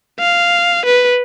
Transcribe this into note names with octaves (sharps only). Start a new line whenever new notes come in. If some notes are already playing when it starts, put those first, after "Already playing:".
F5
B4